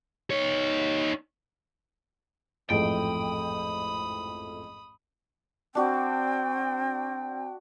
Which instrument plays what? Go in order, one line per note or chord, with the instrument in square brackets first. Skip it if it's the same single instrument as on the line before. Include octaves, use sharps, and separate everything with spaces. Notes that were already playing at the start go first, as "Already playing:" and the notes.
[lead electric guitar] D#4 C#5
[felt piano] A1 G#2 [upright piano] F2 A3 [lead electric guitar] G5 [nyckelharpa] B5 D#6
[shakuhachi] C4 [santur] D4 F#4 [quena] G5